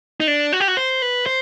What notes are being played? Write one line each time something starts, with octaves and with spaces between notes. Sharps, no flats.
D#4
D4
F#4
G4
F#4
C5
B4
C5